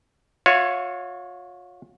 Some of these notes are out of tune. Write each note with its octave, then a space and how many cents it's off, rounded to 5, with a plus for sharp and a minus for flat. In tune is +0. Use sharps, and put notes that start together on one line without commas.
F4 +45 C#5 +0 E5 +35